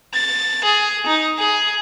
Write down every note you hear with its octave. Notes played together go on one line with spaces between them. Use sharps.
A6
G#4
D#4
G#4